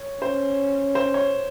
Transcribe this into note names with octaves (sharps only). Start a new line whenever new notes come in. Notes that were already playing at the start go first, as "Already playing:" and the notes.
Already playing: C#5
C#4 C5
C5
C#5